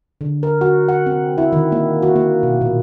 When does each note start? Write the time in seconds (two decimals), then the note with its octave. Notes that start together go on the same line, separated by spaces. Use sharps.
0.21 D3
0.43 A#4
0.61 F#4
0.88 F#5
1.06 C4
1.38 E4
1.53 D#3
1.72 A#3
2.03 F#4
2.16 A#3
2.43 B2
2.61 A#2